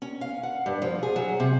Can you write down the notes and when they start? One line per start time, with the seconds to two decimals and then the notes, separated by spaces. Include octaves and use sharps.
0.02 C#4
0.21 F5
0.43 F#5
0.66 G2
0.82 F3
1.03 G#4
1.16 F#3
1.40 C3